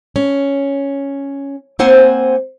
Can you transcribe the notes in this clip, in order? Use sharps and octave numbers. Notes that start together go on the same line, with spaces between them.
C#4
A#3 C4 C5 F#5 G#5